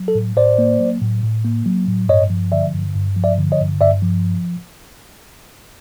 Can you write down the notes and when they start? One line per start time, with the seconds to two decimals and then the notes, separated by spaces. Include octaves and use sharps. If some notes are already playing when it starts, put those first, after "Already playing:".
Already playing: F#3
0.08 A4
0.15 A2
0.36 A2 C5 D5
0.58 A#3
0.80 F#3
1.01 A2
1.23 A2
1.44 A#3
1.66 F#3
1.87 A2
2.09 G2 C#5 D#5
2.30 F3
2.52 D3 D5 E5
2.74 G2
2.95 G2
3.16 F3
3.24 D5 E5
3.38 D3
3.52 C#5 D#5
3.60 G2
3.81 G2 D5 E5
4.02 F3